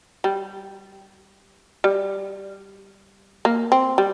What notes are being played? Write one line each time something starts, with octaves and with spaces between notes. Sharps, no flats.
G3
G3
A#3
C4
G3